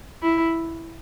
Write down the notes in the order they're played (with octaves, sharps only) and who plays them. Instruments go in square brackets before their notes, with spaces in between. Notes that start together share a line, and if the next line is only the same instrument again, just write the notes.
[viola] E4